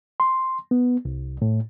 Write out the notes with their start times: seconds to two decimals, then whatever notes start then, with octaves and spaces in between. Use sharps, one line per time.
0.20 C6
0.71 B3
1.05 C2
1.42 A2